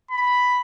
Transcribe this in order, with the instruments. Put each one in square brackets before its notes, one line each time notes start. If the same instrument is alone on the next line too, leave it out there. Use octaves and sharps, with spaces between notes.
[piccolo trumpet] B5